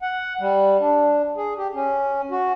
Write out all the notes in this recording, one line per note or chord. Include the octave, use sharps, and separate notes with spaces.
F#5
G3
D4
G#4
G4
C#4
F#4